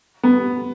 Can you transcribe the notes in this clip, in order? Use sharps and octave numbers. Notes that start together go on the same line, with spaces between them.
B3